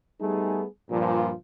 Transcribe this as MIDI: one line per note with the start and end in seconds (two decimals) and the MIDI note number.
0.21 0.65 55
0.21 0.65 57
0.21 0.65 59
0.21 0.65 63
0.21 0.65 68
0.90 1.32 43
0.90 1.32 46
0.90 1.32 53